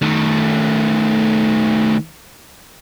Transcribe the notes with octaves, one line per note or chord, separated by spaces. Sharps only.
D#3 A3